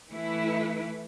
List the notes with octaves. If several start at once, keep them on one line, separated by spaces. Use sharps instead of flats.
E3 A3 E4 B4